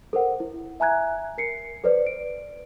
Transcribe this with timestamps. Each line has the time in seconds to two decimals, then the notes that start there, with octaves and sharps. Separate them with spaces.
0.13 A4 A#4 C5 F#5
0.40 E4
0.80 E5 G#5 A#5 F#6 G#6
1.38 A#4 C7 C#7
1.84 A4 B4 C5 D5
2.07 D7